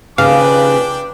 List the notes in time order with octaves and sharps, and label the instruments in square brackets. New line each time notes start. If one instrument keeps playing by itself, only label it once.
[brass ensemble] D#2 F3 B4 [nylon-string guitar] C#3 [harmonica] D4 G5 D6 [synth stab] F5